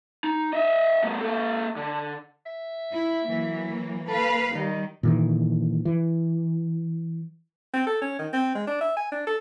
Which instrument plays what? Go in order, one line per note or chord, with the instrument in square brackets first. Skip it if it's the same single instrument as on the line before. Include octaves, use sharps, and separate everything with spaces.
[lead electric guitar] D#4
D#5 E5
A3 B3
A#3 A4
D3
[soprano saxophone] E5
[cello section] E4
E3 F#3 A#3
[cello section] A#3 B4 F5 [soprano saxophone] A4
[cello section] D#3 G3 [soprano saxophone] D#4
[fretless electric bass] A#2 D#3 E3
E3
[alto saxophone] C4
A4
C#4
D#3
C4
G#3
D4
E5
G#5
D4
A4